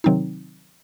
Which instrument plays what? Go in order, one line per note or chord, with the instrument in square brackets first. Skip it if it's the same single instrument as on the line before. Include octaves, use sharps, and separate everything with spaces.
[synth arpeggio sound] C3 D#3 F#3 C4 D#4